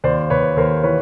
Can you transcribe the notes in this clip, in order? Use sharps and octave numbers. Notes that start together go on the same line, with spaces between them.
D#2 C5 D5
D#2 B4 C#5
D#2 A#4 C5
E3 B4 C#5